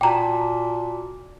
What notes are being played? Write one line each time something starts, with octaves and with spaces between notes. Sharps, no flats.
A#2 F#4 G5 A5 A#5 D6